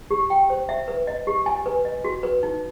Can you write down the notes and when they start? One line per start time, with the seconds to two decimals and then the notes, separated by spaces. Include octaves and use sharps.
0.11 G4
0.30 G5
0.50 C5
0.69 E5
0.88 B4
1.07 D#5
1.27 G4
1.46 G#5
1.66 B4
1.85 D#5
2.04 F#4
2.23 B4
2.43 D#4